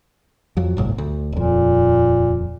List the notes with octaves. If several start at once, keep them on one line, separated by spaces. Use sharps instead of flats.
F2 F#3
G1 C2 A2
D2
D#1 F2 A#2